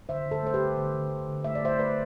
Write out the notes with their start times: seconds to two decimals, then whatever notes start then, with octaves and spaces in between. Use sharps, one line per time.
0.09 D3 C5 E5
0.26 D3
0.31 A4 C5
0.43 A3 C5
0.54 G4 B4
0.59 D3
0.77 D3
0.94 D3
1.10 D3
1.28 D3
1.44 A3 E5
1.55 D5
1.63 A3 C5 E5
1.79 A3 B4 D5